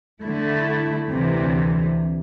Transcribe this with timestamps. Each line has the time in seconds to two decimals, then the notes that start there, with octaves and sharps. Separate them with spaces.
0.23 D3 A3 E4
1.12 D2 C3 E3